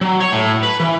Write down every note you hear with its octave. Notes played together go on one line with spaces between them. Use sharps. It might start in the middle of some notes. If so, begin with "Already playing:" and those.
F#3
C#5
A2
B4
E3